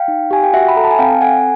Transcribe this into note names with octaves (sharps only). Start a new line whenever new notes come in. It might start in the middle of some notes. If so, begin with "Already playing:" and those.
Already playing: F5 G5
D#4
G4 G#5
G5
F#4 E5 F#5
B5
A4 A#5
A5
G#5
C4 F5 G5
A4 F#5 G#5